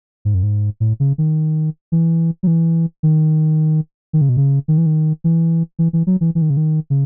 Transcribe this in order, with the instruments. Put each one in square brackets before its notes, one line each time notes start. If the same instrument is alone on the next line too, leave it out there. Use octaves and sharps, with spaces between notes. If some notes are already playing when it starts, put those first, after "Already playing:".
[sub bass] G#2
F#2
G#2
A2
C#3
D#3
E3
F#3
E3
D#3
D#3
C#3
B2
C#3
D#3
E3
D#3
E3
E3
E3
F#3
E3
E3
D#3
C#3
D#3
C#3